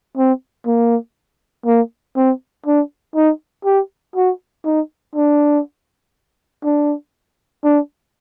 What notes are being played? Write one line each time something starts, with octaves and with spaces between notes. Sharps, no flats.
C4
A#3
A#3
C4
D4
D#4
G4
F#4
D#4
D4
D4
D4